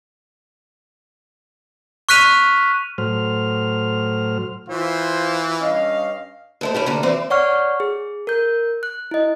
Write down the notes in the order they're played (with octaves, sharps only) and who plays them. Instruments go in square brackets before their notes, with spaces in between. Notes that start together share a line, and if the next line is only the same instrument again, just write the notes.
[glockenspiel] C#6 F6 F#6 B6 D#7 F7
[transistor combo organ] A2 F#3 C5 F6
[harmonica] E3 [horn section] F4 C5
[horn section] G2 C#4 F5 [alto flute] D#5
[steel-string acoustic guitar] D#2 A3 C5
C#4 E4 G4
D2 D3 A#3
E3 C4 C5 D5
[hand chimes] C#5 D5 F#5 C#6 F6
G#4
A#4 G6
F#6
E4 D#5